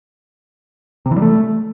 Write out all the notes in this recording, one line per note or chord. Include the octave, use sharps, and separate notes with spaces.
C3
E3
G3
A3